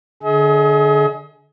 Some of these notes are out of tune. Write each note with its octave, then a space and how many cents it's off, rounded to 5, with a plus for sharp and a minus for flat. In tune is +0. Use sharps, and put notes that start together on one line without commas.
D3 +0 G#4 +25 D#5 +45